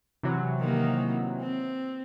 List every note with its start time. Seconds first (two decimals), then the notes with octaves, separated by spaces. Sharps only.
0.23 C3 E3 F#3
0.60 D#3 A#3
1.41 C4